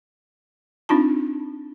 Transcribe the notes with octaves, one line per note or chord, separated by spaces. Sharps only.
C4 D4 D#4 F4 A5